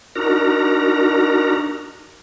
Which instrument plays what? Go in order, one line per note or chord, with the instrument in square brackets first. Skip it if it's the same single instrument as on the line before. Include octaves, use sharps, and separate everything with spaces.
[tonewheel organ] D4 D#4 F#4 A#4 A#5